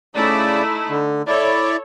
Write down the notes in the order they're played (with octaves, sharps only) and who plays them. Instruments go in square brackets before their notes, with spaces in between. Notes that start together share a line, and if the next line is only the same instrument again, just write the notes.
[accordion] C#3 D5 [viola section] A3 D#4 E4
[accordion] D3
[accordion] E4 D5 [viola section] A4 C#5